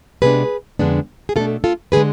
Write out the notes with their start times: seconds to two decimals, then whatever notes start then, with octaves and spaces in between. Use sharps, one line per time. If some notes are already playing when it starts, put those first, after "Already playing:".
0.22 C3 G#3 B3 D4 G#4 B4
0.79 F2 D3 G#3 B3 D4
1.29 G#4
1.36 B2 A3 D4 F4 A4
1.64 F4 A4
1.92 D3 G#3 G#4 B4